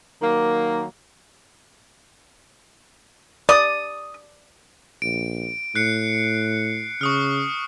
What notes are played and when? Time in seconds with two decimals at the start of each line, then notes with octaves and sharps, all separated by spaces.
0.21 D#3 F#3 A#3
3.49 D5 D#6
5.02 A#1 D7
5.75 A2 F#6 C7 C#7
7.01 C#3 C#6 D#6 F6